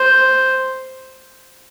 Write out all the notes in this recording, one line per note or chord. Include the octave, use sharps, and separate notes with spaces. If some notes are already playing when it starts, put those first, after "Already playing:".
Already playing: C5